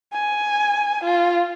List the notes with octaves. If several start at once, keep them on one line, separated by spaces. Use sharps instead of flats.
G#5
F4